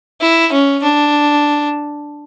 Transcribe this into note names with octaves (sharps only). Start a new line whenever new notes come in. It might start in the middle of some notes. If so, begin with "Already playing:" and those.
E4
C#4
D4